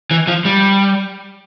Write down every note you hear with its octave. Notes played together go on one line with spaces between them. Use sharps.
E3
F3
G3